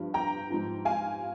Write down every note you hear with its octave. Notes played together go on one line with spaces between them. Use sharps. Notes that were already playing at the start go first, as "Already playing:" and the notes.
Already playing: G2 F3
G5 A#5
G#2 F3
F5 G#5